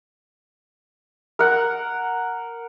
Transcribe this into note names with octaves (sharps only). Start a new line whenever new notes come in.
A#4 F#5